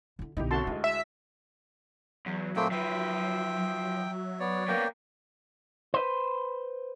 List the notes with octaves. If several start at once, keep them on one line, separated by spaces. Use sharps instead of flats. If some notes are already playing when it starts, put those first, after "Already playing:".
D3 E4
B1 D3 D#4 E4 G4
C2 C#4 F#4 A4 A5 C6
D2 G#3 E4
E5
E2 F#3
A#2 A3 A#3 C4 G5
F3 B4 E5 G5
B3 C#5 D5
A#3 B3 A#4 G5
B4 C5